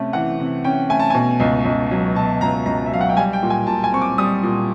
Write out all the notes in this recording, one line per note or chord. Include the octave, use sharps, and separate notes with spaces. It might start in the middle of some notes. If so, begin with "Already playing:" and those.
Already playing: C3 A3 C#4
E3 F#5
C3
C#4 G5
A3 G#5
A5
B2 G#5
C#2
C#2
F#3
B2 A5
C#2 A#5
C#2 A#5
E5
F#3 F5
F#5
G5
G3 G#5
G5
A#2
G#5
A#2 A5
G#5
C4 C#6
D6
G3 D#6
A#2